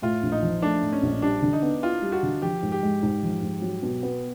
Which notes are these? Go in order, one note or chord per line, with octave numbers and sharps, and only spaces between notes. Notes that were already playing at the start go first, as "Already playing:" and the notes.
A2 F4
A#1
D#4
F3
A3 D4
A2
C#4
A#1
G3 D4
D3
D#4
B3
E4 F4
G3
F#4
D3
F3 G4
G#2
G4
G#3
G#2
F3
G#2
F#3
B2
B3